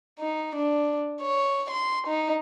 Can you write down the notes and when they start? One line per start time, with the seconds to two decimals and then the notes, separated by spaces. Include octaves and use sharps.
0.19 D#4
0.56 D4
1.22 C#5
1.71 C6
2.08 D#4